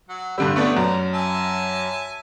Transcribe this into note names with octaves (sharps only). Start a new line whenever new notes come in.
F#3 F#5
G2 D3 G3 B5 E6
A3 B3 D4 B4 C#5 D5
F#2 A5 A#5
E5 G#5 A5